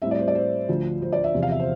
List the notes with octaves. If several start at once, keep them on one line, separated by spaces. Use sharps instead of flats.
A2 G3 C4 E5
D5
C5
D5
C5
D2 D3 F3
C5
D5
E5
E2 C3 F3
F5
E5
C5